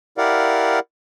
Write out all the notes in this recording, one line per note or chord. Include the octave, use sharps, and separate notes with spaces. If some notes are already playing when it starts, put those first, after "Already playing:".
E4 G4 A#4 D5 F5 F#5